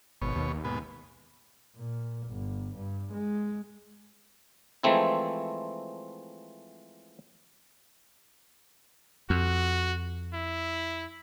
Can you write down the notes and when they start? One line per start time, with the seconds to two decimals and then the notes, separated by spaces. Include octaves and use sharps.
0.21 G#1 B2 C#5
0.35 D#2
0.64 G#2 B2 B3
1.77 A#2
2.28 G1
2.76 G2
3.13 G#3
4.83 E3 F3 G#3 A3 C4 E4
9.30 F2 F#4
10.34 E4